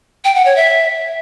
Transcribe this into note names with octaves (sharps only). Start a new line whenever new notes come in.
G5
F#5
C#5
E5